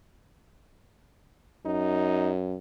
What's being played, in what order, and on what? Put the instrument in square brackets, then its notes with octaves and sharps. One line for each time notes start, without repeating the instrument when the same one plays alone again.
[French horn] F#2 [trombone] D#4